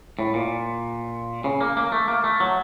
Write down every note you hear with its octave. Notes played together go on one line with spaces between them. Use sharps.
A2
A#2
C#3
A#3
A#3
A3
A#3
A3
F#3